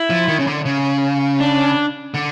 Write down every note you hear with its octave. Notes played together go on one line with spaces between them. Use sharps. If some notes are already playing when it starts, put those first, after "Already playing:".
Already playing: E4
F3
D#3
C#3
D3
C#3
D4
D3